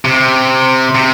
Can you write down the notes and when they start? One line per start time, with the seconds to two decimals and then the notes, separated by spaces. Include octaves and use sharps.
0.05 C3
0.95 C3